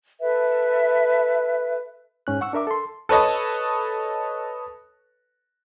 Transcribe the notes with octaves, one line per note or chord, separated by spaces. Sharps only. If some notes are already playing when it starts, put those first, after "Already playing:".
A4 B4 E5
G#2 C#4 F#6
F#5 C#6 E6
D4 A#4 E5 D6
A4 C6
A4 B4 C#5 D#5 A5